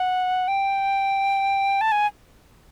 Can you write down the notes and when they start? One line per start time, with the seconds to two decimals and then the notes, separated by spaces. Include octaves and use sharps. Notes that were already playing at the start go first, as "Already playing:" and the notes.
Already playing: F#5
0.48 G5
1.81 A5
1.92 G#5